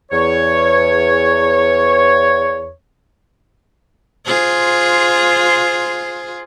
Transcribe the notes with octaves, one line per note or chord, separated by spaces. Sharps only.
E2 C#5
F4 G#4 C5